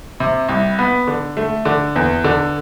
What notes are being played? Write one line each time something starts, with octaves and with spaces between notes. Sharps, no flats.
C3
C2
B3
D3
A3
D3
E2
D3